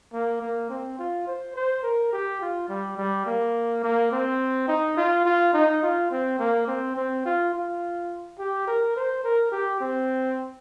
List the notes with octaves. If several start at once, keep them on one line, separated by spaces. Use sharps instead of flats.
A#3
A#3
C4
F4
C5
C5
A#4
G4
F4
G3
G3
A#3
A#3
C4
D#4
F4
F4
D#4
F4
C4
A#3
C4
C4
F4
F4
G4
A#4
C5
A#4
G4
C4